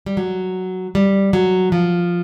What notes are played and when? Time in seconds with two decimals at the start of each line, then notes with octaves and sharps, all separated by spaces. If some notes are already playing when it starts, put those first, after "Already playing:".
0.06 G3
0.17 F#3
0.95 G3
1.33 F#3
1.72 F3